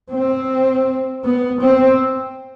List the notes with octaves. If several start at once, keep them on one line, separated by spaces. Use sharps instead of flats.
C4
B3
C4